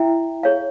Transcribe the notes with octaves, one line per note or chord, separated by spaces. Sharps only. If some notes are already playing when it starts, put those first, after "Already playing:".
Already playing: E4 E5 G5 A#5
G#4 C#5 F5